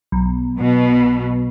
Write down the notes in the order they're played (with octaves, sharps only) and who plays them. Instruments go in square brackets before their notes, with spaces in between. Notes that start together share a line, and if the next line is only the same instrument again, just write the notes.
[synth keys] B1
[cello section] B2